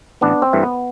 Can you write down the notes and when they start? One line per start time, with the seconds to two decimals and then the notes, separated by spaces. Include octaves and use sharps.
0.21 A1 B3 D4
0.42 C4
0.53 G2 E3 A3
0.63 B3